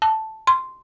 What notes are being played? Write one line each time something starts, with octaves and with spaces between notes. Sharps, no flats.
A5
C6